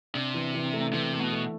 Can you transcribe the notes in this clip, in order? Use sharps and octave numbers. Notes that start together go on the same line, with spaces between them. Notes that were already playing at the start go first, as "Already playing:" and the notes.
C3 D4
E3
E3
A3
C3 E3
A3
B2
A3